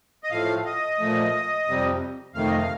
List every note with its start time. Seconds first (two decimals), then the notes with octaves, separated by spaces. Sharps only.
0.24 D#5
0.31 A2 F3 A3 F5
0.65 D#5
0.99 A#2 F3 A3
1.68 F2 C3 G3
2.34 F2 C3 D#3 A3 F5
2.47 D#5
2.57 F5